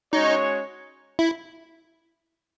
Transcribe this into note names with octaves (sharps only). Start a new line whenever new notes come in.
G#3 C#4 D#4 F#4 C#5
E4